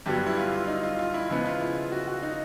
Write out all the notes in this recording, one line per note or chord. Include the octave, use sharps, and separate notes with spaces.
G2 D3 F#3 B3 G4
E4
F4
F4
D#4
F4
F4
E4
C#3 F3 G#3 B3 E4
F4
E4
F4
F#4
F#4
D#4